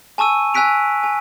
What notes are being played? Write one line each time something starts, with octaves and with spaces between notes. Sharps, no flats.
G#5 A5 C#6 E6 D#7
G#5 E6 F#6 B6 D7 F7
G#5